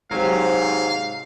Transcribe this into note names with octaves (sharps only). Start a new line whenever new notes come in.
G#2 C3 F#3 C4 G4 F5